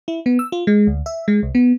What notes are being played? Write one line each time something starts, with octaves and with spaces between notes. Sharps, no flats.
E4
B3
E6
F4
G#3
D2
E5
G#3
C2
B3